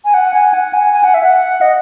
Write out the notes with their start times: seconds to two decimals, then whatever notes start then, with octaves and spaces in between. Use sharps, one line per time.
0.05 G#5
0.14 F#5
0.34 G#5
0.54 F#5
0.74 G#5
0.93 G#5
1.04 F#5
1.14 E5
1.24 F#5
1.61 D#5